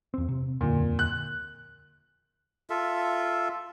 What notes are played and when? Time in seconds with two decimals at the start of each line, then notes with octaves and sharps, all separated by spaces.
0.14 E2 C4
0.29 C3
0.61 D#1 F2 A#2 D3
0.99 F#6
2.70 F4 A4 E5